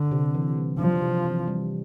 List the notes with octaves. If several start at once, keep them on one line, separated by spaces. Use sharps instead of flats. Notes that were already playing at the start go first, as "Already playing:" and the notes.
Already playing: D3 D4
C3
E3
G3
F3 D4
C3
E3
G3